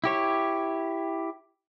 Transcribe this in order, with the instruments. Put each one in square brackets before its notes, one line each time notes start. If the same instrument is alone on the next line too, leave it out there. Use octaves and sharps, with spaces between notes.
[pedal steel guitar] E4 G4 C#5